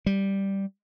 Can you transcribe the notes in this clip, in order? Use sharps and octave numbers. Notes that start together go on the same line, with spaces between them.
G3